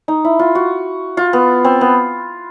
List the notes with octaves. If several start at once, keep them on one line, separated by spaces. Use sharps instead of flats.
D#4
E4
F4
F#4
F4
B3
C4
B3